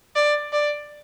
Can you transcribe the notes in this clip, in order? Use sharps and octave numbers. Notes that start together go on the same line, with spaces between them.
D5
D5